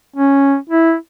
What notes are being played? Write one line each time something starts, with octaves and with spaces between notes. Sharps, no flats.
C#4
E4